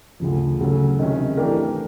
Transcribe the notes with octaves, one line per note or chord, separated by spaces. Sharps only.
D2 C#3 F3
C#3 F#3 A3 C#4
C3 D#3 G#3 C#4
E3 A3 D4 G4 A#4